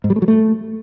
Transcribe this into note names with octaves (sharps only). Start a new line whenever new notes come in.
G#2
G3
A3
F#3
A3